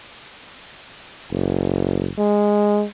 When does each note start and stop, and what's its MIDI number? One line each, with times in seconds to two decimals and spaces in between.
1.31 2.09 30
2.18 2.85 56